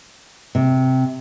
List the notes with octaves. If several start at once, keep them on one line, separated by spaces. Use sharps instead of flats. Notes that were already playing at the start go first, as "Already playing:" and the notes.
C3